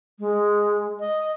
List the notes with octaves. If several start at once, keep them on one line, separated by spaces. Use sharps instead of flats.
G#3
D#5